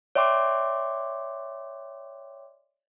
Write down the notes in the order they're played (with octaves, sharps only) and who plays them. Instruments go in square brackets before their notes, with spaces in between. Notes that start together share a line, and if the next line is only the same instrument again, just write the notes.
[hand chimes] C#5 D5 E5 G5 C6 D6